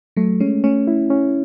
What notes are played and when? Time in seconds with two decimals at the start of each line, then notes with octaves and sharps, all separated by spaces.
0.17 F#3 A3
0.40 G#3 C#4
0.64 A3 C#4
0.87 E4
1.10 C#4